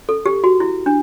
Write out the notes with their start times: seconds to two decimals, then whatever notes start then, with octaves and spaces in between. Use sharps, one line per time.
0.09 A4
0.26 G4
0.44 F#4
0.60 E4
0.86 D4